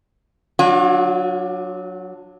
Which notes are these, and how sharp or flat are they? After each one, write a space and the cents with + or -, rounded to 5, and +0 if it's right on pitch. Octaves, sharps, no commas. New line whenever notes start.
F#3 +0 D4 +10 F4 +45